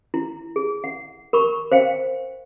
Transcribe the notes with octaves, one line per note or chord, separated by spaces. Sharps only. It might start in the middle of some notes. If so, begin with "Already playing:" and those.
E4
G#4
F#5
A#4 B5 C#6
C5 F5 G5